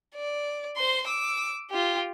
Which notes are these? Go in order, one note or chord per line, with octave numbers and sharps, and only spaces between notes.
D5
C5 C6
D6 E6
F4 G4